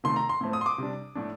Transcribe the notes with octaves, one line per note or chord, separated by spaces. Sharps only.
C3 D#3 A3 C6
A#5
C6
A2 A3 C4
D#6
C6
D6
C3 G3 D4
A2 A3 D4